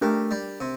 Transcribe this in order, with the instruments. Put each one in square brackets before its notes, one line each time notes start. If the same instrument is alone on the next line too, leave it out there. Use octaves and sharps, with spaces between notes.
[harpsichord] A3 [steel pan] D4 G4 A#4
[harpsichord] G3
C3